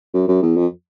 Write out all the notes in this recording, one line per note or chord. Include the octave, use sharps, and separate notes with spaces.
F#2
F#2
E2
F2